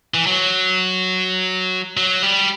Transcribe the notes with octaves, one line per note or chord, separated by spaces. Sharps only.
E3
F#3
F#3
G3